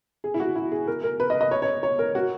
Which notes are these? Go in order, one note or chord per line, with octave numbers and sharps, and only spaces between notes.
G#4
E4
F#4
E4
G#4
A#4
A#4
B4
D#5
D#5
C#5
C#5
C#5
A#4
F#4